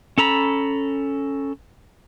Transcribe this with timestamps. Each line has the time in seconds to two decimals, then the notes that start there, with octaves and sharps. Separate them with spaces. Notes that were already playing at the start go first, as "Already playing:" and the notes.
0.18 C#4 A4 A#5 B5